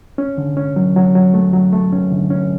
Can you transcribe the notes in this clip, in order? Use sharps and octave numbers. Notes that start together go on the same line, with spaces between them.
C#4
D3
C#4
F#3
F#3
F#3
A3
F#3
A3
C#4
D3
C#4